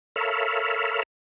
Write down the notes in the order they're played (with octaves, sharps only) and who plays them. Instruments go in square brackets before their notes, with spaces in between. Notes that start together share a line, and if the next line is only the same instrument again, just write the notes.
[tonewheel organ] A4 A#4 C#5 E5 F5 B5